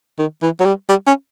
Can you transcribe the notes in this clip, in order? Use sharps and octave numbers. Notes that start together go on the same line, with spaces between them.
D#3
E3
F#3
G3
G3
C#4